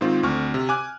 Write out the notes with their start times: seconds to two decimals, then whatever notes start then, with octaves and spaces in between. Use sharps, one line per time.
0.01 G#2 D#3 C4 F4
0.23 D2 C4 C#6 F6
0.54 C3
0.69 G#5 D6 F#6